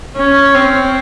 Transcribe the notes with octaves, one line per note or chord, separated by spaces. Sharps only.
C#4
C4